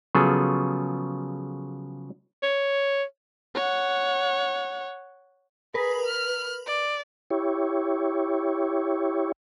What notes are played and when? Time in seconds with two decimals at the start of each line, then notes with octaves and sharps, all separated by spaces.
0.15 C#3 F3 F#3 B3 G#4 A4
2.43 C#5
3.55 C#5 F#5
5.74 G#4 A#4 B4
6.06 F6
6.66 D5
7.31 E4 G4 C#5